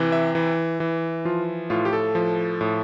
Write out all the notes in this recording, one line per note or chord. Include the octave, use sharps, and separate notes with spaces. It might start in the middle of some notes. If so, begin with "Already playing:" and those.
Already playing: C3 E3
E5
E3
E3
F3 F4
A2 F4
G4
A4
F3
A2